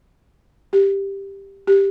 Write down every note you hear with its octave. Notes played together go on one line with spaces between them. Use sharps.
G4
G4